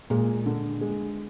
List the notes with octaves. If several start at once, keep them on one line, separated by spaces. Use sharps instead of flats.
A#2 G#3
D3
G#3